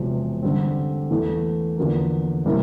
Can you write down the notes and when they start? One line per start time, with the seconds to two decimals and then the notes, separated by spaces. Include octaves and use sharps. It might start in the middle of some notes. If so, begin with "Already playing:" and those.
Already playing: E1 E2 C3 F3
0.42 G2 D3 G3 C4
1.11 E2 E3 A3
1.77 E2 D3 F3 A#3
2.46 C3 G3 A#3 E4